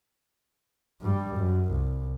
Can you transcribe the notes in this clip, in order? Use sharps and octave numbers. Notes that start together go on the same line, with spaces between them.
G2 G3
F#2
C2